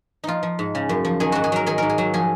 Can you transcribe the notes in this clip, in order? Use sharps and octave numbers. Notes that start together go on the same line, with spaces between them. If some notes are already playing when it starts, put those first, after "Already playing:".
F3 D#4 F4
F3
G#2
C#3
F#2
F3
D#3 G#4
G#2 F#4
G#4
F#3 A#4
D#3 G#4
G#2 A#4
G#4
F#3
F3 G#4